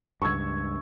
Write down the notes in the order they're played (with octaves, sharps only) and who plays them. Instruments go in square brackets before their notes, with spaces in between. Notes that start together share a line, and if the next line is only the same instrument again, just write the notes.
[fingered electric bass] C#2 G2 [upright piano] C#6 E6 G#6